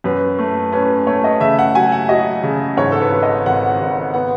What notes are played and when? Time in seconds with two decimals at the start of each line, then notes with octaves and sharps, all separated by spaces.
0.04 F#2 B4
0.39 A3
0.72 C#4 B4
1.07 A3 C#5
1.24 D#5
1.40 C#3 E5
1.59 F#5
1.75 F#3 G#5
1.92 F#5
2.09 F#3 D#5
2.43 C#3
2.77 G#2 C#5
2.92 A4
3.00 B4
3.12 G#1
3.23 D#5
3.46 G#1 F#5
3.80 G#1
4.14 B3 F#5